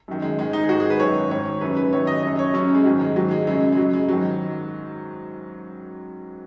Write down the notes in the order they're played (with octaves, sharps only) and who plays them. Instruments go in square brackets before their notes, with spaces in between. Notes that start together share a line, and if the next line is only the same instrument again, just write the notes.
[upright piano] F#2 D#3
G#3
G#2 D#3 G#3
D#4
G#4
G#2 D#3 F#4
G#4
B4
F#2 D#3 C#5
G#2 D#3 C#5
F#2 C#3 B4
B4
F#2 D#3 C#5
D#5
F#2 C#3 D#5
C#5
F#2 C#3 C#4
C#4
G#3
G#2 D#3 F#3
G#3
G#2 D#3 F#3
G#3
F#2 C#3 G#3
G#3
F#2 C#3 F#3
G#3
G#2 D#3 F#3